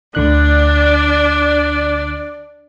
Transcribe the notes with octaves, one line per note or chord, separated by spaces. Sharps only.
D2 D3 D4 D5 F#6